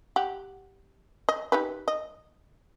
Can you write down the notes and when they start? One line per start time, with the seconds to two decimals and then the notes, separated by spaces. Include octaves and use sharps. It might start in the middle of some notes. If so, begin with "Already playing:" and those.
0.16 G4 F#5
1.29 D#5
1.52 D#4 G4 B4
1.88 D#5